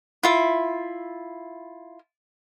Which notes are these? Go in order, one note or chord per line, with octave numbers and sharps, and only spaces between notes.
E4 F4 E5